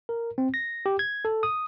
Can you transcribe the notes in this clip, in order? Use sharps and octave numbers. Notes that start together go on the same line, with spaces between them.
A#4
C4
A#6
G4
G#6
A4
D#6